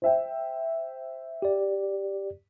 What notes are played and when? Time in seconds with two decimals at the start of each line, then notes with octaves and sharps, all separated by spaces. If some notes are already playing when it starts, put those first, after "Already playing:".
0.02 C5 E5 G5
1.42 G4 D5